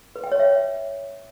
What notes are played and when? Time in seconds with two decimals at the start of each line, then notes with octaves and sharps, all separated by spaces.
0.16 B4
0.24 G5
0.32 C#5
0.40 E5